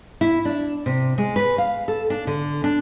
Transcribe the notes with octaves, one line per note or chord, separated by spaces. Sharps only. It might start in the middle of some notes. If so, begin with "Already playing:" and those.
E4
D4
C3
G#3
B4
F5
A4
D4
D3
D4